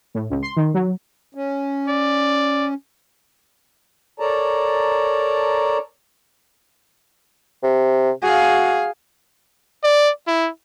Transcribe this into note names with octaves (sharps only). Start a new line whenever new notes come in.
A2
C#2
C6
D#3
F#3
C#4
D5
A4 A#4 C#5 D5 A5 A#5
C3
F#4 G#4 F5
D5
E4